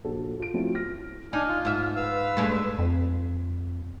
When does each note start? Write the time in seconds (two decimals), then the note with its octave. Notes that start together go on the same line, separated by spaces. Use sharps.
0.04 A#1 F#4 A4
0.40 F4 D7
0.54 F3 F#3 A3 C4 E4 F4
0.75 F6 A#6
1.33 D4 D#4 G#5 F6
1.48 F4
1.65 G#2 E5
1.96 B4 F5 E6
2.37 G2 G#3 A3
2.79 F2